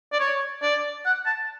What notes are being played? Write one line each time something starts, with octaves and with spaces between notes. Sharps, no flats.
D5
C#5
D5
F#5
A5